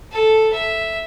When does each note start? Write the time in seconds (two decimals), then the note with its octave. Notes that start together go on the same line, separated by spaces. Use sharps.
0.12 A4
0.53 E5